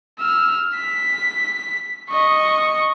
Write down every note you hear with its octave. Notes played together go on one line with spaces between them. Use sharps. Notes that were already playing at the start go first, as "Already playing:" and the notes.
E6 F6
B6
D#5 C#6